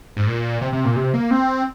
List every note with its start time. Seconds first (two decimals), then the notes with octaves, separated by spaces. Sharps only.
0.17 G#2
0.27 A#2
0.61 C3
0.73 C3
0.85 A#2
0.96 C3
1.14 A#3
1.31 C4